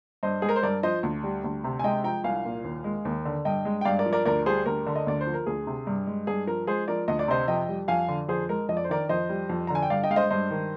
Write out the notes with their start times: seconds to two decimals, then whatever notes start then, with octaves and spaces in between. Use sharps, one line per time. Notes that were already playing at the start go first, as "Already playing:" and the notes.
0.23 G2 C5 D#5
0.42 G#3 G#4
0.49 A#4
0.56 C5
0.63 G2 A#4 D5
0.83 F3 C5 D#5
1.03 D2
1.24 G3
1.44 D2
1.64 C3
1.79 G#5
1.84 G#3 D#5 G5
2.04 F3 G5 A#5
2.24 C2 F5 G#5
2.45 A#2
2.64 D#2
2.84 G#3
3.05 D#2
3.25 D3
3.45 G2 D#5 G5
3.65 G#3
3.81 G5
3.85 G2 D5 F5
3.99 A#4 D5
4.06 F3
4.13 A#4 D5
4.25 D2 A#4 D5
4.46 G3 G#4 C5
4.66 D2 A#4
4.86 D3
4.96 D#5
5.07 D2 D5
5.21 C5
5.27 F3
5.34 A#4
5.46 D2 G#4
5.67 C3
5.87 G2
6.07 G#3
6.27 G2 G#4
6.47 F3 A#4
6.67 G#3 G#4 C5
6.88 F3 A#4 D5
7.08 D2 D#5
7.19 D5
7.28 C3 C5 D#5
7.48 F2 D#5 G5
7.68 G3
7.88 F2 F5 G#5
8.08 D3
8.28 F2 G#4 C5
8.49 G#3 A#4
8.69 F2 D#5
8.77 D5
8.84 C5
8.89 D#3 A#4 D5
9.09 F2 C5 D#5
9.29 G3
9.49 F2
9.67 A#5
9.70 D3 G#5
9.82 G5
9.90 G2 D5 F5
10.03 D#5 G5
10.10 G#3 F5
10.16 C5 D#5
10.30 G2 C5 D#5
10.51 D#3